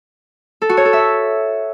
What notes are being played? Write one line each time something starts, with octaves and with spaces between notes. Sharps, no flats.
A4
F#4
C#5
A4
E5